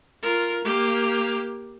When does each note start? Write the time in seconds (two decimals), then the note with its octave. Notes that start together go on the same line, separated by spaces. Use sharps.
0.22 F4 A#4
0.64 A#3 G4